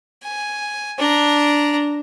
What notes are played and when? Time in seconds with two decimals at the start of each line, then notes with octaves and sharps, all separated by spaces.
0.23 G#5
0.99 D4 A#5